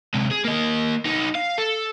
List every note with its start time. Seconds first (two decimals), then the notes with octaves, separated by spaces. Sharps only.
0.14 C3 G#3
0.31 G#4
0.45 A#3 D#5
1.05 B3 D#4
1.35 F5
1.58 A4